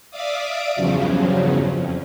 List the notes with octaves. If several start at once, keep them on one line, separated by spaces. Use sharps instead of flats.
D5 E5 F5 D6 D#6
E2 G2 C#3 F3 F#3
F2